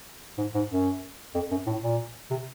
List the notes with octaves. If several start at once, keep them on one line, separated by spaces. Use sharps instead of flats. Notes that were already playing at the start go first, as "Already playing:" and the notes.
G#2
G#2
F#2
F2
F#2
A2
A#2
C3